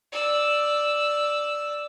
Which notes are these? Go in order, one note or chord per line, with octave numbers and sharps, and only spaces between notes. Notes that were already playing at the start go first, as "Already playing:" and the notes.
D5 E6